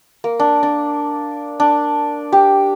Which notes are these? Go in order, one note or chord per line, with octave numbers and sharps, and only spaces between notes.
A#3
D4
D4
D4
G4